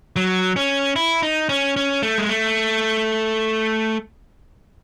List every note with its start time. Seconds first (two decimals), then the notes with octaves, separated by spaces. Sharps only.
0.16 F#3
0.56 C#4
0.96 E4
1.22 D#4
1.49 C#4
1.76 C#4
2.03 A3
2.18 G#3
2.29 A3